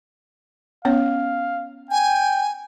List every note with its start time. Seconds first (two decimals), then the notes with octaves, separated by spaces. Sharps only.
0.85 B3 C#4 C#5 F5
1.91 G5 G#5